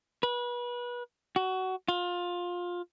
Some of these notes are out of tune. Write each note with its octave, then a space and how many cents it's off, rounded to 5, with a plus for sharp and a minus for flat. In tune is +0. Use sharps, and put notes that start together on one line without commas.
B4 -30
F#4 +20
F4 +20